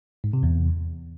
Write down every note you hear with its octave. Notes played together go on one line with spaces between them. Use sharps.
G#2
C3
E2